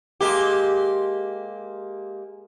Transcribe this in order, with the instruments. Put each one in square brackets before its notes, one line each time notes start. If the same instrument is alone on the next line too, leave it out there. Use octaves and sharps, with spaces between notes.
[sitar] G#3 A#3 G4